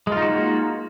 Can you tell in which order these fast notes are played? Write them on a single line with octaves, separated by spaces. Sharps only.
G#3 F4 D#4 F#4 A#3